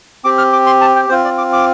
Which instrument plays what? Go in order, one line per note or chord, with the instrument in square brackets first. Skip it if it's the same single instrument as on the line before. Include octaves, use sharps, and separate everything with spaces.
[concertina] C4 G4 D6
F6
D6
C6
A5
G5
C4 F4 C5
D5
D6
D6